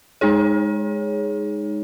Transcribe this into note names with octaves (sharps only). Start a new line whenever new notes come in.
G#3 D#4 G#4 C#5